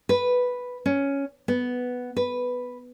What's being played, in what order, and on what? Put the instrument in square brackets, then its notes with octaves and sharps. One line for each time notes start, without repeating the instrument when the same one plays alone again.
[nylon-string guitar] B4
C#4
B3
B4